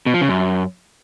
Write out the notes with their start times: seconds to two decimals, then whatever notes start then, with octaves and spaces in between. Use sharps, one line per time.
0.06 B2
0.14 F3
0.21 C#3
0.29 F#2